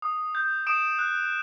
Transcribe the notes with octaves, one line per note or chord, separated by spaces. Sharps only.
D#6
G6
D#6 D7 E7
F#6